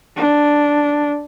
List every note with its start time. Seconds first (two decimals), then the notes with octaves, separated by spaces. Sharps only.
0.16 D4